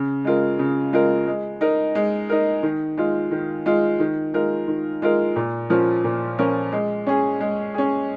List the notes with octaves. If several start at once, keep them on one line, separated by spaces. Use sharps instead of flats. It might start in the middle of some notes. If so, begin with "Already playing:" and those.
Already playing: C#3
G#3 F4 A#4
C#3
G#3 F4 A#4
G#3
D#4 A#4
G#3
D#4 A#4
D#3
G#3 F4
D#3
G#3 F4
D#3
G#3 F4 A#4
D#3
G#3 F4 A#4
A#2
F3 C#4 F4 A#4
A#2
F3 C#4 F4 A#4
G#3
C#4 G#4
G#3
C#4 G#4